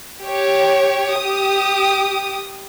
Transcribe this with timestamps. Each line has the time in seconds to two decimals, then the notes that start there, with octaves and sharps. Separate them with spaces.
0.24 G4 C#5
1.17 G4 D#6